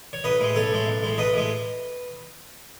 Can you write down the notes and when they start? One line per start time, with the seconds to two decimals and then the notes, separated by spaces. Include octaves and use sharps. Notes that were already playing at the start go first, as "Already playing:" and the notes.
0.13 C#5
0.24 B1 B4 D#5
0.41 A2 G#3
0.56 B1 A4 C#5
0.72 A2 G#3
0.87 B1
1.03 A2 G#3
1.18 B1 B4 D#5
1.34 A2 G#3